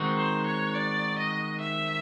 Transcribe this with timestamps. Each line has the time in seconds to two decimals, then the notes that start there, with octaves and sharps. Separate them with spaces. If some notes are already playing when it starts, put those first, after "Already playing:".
Already playing: D#3 G#3 C4 D#4 F#4
0.17 C5
0.46 C#5
0.75 D5
1.19 D#5
1.61 E5